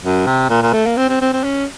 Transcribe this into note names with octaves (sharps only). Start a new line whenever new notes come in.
F#2
C3
A#2
A#2
A3
A#3
C4
C4
C4
C4
C#4